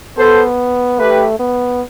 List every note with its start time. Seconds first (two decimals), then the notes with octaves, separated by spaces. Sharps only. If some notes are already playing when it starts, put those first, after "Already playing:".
0.18 B3 A4 C5
0.99 A3 G4 B4
1.39 B3